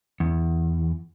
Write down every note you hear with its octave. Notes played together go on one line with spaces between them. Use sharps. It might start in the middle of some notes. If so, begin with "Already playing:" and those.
E2